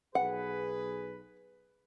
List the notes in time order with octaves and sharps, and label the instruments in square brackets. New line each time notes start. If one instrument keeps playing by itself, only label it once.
[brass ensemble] B1 G#4 B4 [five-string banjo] F#5